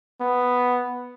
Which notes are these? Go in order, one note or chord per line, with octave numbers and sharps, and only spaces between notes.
B3